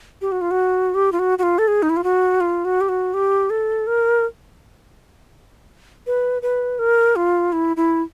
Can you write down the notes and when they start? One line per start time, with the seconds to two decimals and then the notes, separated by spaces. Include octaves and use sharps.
0.21 G4
0.32 F#4
0.41 F4
0.51 F#4
0.94 G4
1.12 F4
1.19 F#4
1.39 F#4
1.43 F4
1.58 A4
1.68 G#4
1.83 D#4
1.90 E4
1.97 F4
2.04 F#4
2.41 F4
2.65 F#4
2.81 G4
2.89 F#4
3.14 G4
3.50 A4
3.87 A#4
6.07 B4
6.42 B4
6.79 A#4
7.16 F4
7.52 E4
7.77 E4